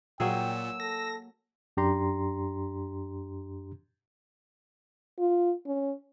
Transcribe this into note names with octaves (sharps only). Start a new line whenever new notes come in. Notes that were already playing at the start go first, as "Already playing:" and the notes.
A#2 F#3 A#3 G#4 G5 E6
A4 A#6
F#2 D4 G4 A#5 C6
F4
C#4